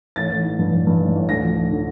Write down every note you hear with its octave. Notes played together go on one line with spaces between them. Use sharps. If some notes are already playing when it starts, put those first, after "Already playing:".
A1 A6
A1
E3
G2
G2
G2
A1
A1
D2 A#6
F3
F3
D3